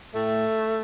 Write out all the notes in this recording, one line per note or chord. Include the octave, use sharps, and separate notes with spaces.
A2 A3